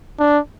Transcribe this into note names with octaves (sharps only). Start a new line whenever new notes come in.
D4